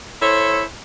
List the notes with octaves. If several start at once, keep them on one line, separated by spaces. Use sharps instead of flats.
E4 A4 C5 C#5